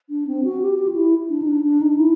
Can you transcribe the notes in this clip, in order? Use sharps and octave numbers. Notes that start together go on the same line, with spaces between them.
D4
C4
F#4
G4
G4
F4
E4
D4
D#4
D4
D4
D#4
E4